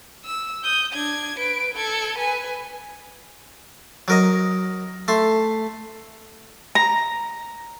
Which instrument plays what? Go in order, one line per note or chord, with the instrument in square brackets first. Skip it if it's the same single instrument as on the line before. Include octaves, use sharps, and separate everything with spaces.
[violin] E6
D#6 G6
D4 G#6
B4 D7
A4 G#6
B4 G#5
[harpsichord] F#3 A#4 D#5
A3 C6
[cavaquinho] A#5